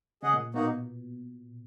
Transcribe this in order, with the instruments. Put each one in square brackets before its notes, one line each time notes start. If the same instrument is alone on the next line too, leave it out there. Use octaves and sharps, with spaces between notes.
[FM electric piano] C#3 [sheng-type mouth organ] G#4 D#5 F#5
[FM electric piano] A#2
[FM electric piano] B2 [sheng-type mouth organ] A#3 D#4 F#4